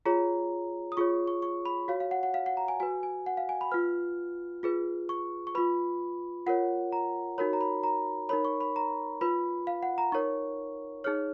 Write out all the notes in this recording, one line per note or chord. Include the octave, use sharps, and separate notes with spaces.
F4 G#4 C#5 A#5
D#6
F4 G#4 C#5 C#6
C#6
C#6
B5
F#4 C#5 F5
F5
F#5
F#5
F5
F#5
A#5
G#5
F#4 B4 G#5
G#5
F#5
F5
G#5
B5
F4 B4 F6
F4 G#4 B4
C#6
C#6
F4 B4 B5
F4 A#4 C#5 F#5
A#5
D#4 F#4 A#4 C#5 B5
A#5
B5
A#5
D#4 A#4 C#5 B5
C#6
B5
A#5
F4 B4 B5
F5
F#5
A#5
D#4 A#4 C#5 C#6
D#4 G#4 C#5 F6